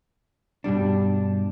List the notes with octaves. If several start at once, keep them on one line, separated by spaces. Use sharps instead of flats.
G2 B2 G3 D4